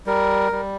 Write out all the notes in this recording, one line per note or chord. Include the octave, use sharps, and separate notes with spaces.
G3 A#4
G3